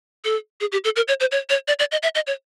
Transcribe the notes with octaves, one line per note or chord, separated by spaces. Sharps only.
A4
G#4
G4
A4
A#4
C#5
C5
C#5
C#5
D5
D5
D#5
E5
D#5
C#5